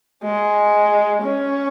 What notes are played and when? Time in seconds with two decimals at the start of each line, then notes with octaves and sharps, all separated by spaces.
0.24 G#3
1.22 C#4